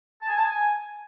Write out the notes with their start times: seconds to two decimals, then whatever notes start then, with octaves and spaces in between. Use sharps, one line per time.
0.21 A5
0.28 G#5
0.36 A5
0.43 G#5